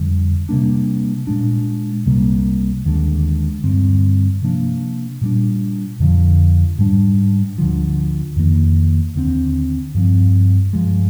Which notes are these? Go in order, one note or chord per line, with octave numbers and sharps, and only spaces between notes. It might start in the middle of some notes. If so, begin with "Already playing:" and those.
Already playing: F2 D3 G3
C3 G3 A#3 D4
A#2 G#3 D4
C2 C3 G3 A#3
D#2 D3 G#3 D4
G2 D3 G3 C4
C3 F3 A#3 D4
A#2 G3 D4
F2 D3 F3
G#2 G3 D4
D2 D3 F3
F2 D#3 A#3
D#2 D3 G#3 C4
G2 F3 C4
G2 F3 G#3